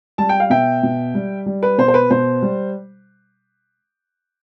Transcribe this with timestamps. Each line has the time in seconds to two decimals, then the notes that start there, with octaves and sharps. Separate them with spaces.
0.18 G3 A5
0.29 G5
0.40 F5
0.50 B2 E5 G5
0.83 B2
1.15 G3
1.46 G3
1.63 B4
1.78 B2 C5
1.88 C5
1.94 B4
2.10 B2 C5
2.42 G3